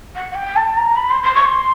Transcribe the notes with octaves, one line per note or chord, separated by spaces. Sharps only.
F#5
F#5
G5
A5
A#5
B5
C6
C6
C#6
C6